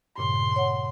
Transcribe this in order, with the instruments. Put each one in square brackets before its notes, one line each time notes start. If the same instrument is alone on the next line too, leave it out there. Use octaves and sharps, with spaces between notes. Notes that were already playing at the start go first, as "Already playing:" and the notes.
[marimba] G2 A#2 C#3 [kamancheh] C6
[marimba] C#5 F#5